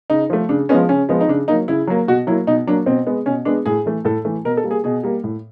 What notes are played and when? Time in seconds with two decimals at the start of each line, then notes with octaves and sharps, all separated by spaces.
0.10 C#3 D#4
0.30 F3 A3
0.49 C#3 D4
0.69 F3 G#3 B3 C#4
0.89 C#3 C#4
1.09 F3 G#3 B3
1.21 D#4
1.28 C#3 D4
1.48 F#3 A#3 D#4
1.68 C#3 E4
1.87 F#3 A#3
2.08 B2 F#4
2.27 F#3 A#3 E4
2.47 B2 D#4
2.67 F#3 A#3 D4
2.86 B2 C4
3.07 G#3 B3
3.26 B2 C#4
3.45 G#3 B3 D4
3.66 A2 G#4
3.86 E3 A3
4.05 A2 A4
4.25 E3 A3
4.45 B2 A#4
4.57 A4
4.64 G3 A#3
4.71 G#4
4.84 B2 G#4
5.03 G3 A#3
5.24 A2